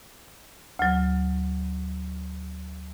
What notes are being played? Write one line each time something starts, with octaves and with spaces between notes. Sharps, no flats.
D2 F#3